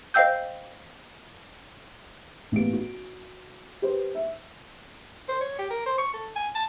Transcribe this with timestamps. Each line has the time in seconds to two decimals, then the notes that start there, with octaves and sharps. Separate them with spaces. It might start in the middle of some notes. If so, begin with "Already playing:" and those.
0.14 C5 D#5 F5 G5 E6 G6
2.52 A1 A2 A#3 B3 G4 D7
2.73 F#4
3.82 G4 B4 C5
4.15 E5
5.28 C5
5.41 C#5
5.59 G4
5.71 A#4
5.86 C5
5.98 C#6
6.14 A4
6.36 G#5
6.55 A5